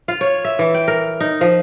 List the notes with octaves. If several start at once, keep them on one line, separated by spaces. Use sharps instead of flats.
F4
C#5
E5
E3
G5
A#4
D#4
F3